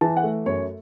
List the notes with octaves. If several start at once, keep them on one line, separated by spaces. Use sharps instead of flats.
E3 A5
F#5
A3
F#2 C#5